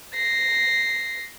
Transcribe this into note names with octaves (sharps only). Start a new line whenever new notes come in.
A#6 C7